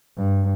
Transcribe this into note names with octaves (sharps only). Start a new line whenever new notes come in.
G2